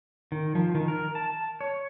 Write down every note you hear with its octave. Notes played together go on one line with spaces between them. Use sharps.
D#3
F3
D#3
A#4
A5
C#5